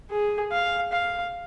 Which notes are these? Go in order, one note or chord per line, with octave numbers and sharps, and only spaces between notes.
G#4
F5
F5